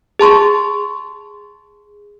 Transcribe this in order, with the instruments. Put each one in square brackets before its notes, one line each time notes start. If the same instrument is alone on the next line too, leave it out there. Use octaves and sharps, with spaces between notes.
[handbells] G#4 A5 C6 C#6